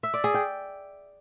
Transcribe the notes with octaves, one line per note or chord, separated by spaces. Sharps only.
E5
D5
G#4
G5